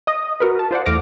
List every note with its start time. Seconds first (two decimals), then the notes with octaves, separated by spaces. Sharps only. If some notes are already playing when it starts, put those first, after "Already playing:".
0.07 D#5 D#6
0.40 F#4 A#4 B4
0.59 A5
0.71 F4 C5 D5 F#5
0.86 E2 A3 D6 F6 A#6